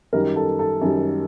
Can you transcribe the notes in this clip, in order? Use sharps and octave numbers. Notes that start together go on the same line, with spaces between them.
F#2 D#3 G3 A#4
A4
A4
F#2 D#3 G3